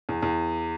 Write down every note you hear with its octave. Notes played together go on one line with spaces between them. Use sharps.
E2
E2